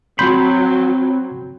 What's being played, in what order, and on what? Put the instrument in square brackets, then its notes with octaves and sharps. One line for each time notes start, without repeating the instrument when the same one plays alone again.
[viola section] F#3 [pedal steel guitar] C4 B5 [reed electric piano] C6 G6